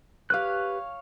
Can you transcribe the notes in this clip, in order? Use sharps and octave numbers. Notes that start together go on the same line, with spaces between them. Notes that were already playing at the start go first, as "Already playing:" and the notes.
G4 B4 C#5 F5 F#6